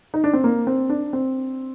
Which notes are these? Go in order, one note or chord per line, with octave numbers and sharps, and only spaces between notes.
D#4
D4
C4
A#3
C4
D4
C4